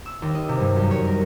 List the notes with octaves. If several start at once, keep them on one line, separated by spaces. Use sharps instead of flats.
E6
D#2
D#5
C3
G2
F#2
C#5
A#4